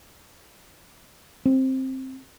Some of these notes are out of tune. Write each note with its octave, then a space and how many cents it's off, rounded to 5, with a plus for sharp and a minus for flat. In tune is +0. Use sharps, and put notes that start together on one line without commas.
C4 +10